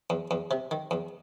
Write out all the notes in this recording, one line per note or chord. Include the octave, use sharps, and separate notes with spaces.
E2
E2
C3
D#3
E2